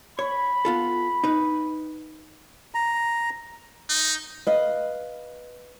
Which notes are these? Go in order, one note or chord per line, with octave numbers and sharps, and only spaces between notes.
C#5 B5
B3 F4 A4
D#4 B4
A#5
D#4
B4 D#5 F5